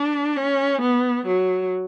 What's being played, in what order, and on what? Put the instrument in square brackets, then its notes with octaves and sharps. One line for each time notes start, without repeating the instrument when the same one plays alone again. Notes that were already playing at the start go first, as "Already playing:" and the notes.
Already playing: [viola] D4
C#4
B3
F#3